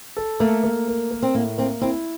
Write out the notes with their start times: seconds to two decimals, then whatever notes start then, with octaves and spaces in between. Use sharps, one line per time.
0.17 A4
0.40 A3 A#3
0.64 A#3
0.88 A#4
1.11 A#4
1.22 C4
1.34 A2 A#3
1.58 A#3 C4
1.81 C4 E4